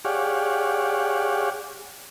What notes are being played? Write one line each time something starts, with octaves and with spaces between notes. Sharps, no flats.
G4 G#4 C#5 D5 F5 F#5